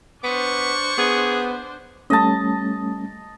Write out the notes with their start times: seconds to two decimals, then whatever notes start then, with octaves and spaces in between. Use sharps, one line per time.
0.24 B3 D4 C5 C#6
0.98 B3 G#4
2.10 G3 A3 C#4 D#5 A5